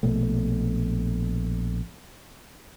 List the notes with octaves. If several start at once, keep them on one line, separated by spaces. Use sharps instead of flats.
A#1 B2 A3